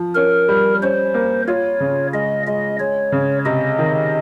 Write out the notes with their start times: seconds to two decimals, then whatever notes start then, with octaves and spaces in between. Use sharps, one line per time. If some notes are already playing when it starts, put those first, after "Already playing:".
Already playing: F3
0.15 C#4 A#4
0.48 G3
0.82 C#4 C5
1.14 A#3
1.48 F4 C#5
1.80 C#3
2.13 G#3 D#5
2.47 G#3 D#5
2.80 G#3 C#5
3.12 C#3
3.45 C3 D#5
3.78 D#3